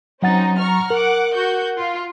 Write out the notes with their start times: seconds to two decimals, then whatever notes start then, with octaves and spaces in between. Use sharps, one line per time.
0.22 F#3 C4 C#4 D#4 F#5 A6
0.59 A#5 C#6 F6
0.90 A#4 F#5 D6
1.34 F#4 G6
1.78 F4